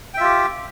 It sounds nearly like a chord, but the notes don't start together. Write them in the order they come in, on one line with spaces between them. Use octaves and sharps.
G5 E5 F4 G4